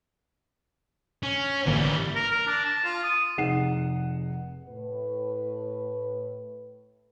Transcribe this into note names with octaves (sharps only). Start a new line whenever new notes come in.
C#4
G#1 D3 E3 G3 A#3
A#4
A#4
D4
A5
F4
D#6
F1 D#4 G#4 F#5 C7 E7
A2 B4